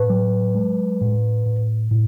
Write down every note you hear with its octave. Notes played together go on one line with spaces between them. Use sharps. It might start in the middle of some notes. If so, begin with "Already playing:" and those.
Already playing: A2 B4
F#3
G#3
A2
A2
A2